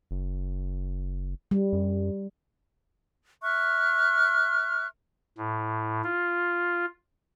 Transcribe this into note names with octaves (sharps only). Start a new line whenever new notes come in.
F#1
G3
F#2
E5 C#6 F6 F#6
A2
F4